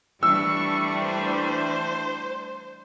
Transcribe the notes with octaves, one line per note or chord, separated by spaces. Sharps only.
E3 G3 A3 D4 C#6 E6
C5